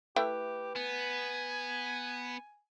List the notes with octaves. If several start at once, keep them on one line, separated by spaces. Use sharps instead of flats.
A3 E4 G4 B4 G5
B3 G#5